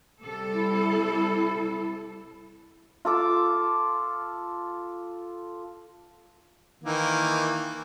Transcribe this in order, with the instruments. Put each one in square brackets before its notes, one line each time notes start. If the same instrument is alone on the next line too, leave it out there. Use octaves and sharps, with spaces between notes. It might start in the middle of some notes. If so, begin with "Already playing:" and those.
[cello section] C3 G3 A4
[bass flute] E4
[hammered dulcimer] F4 A4 D6
[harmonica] D#3 E3 A#3